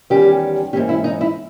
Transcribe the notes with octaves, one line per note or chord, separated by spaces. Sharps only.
E2 D#3 G3 C#4 G4
G#2 E3 A#3 C#4 G4
E4
D#4
E4